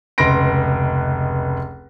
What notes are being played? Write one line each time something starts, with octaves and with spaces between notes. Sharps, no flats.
F1 C#2 B4 C6 A#6 D7